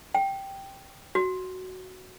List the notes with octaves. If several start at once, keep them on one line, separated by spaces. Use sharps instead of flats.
G5
F#4